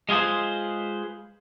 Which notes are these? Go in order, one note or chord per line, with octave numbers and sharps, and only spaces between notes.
G#3 F4 G#4 B4 C5